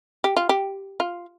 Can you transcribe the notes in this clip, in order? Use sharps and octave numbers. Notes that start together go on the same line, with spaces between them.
G4
F4
G4
F4